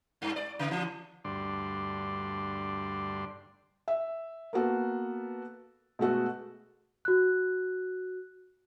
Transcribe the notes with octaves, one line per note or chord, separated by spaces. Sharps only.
G2
D5
C#3
E3
D2 G2 D5 C6
E5
A#3 B3 F#4 A4
B2 G#3 A3 F#4 A4
F#4 F#6